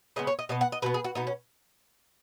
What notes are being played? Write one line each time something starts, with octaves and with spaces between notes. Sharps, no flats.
C#3 G#3 B3 D#5
C#5
D#5
B2 B3 D#5
F#5
D#5
B2 B3 B4
G#4
F#4
B2 B3 D#4
C#4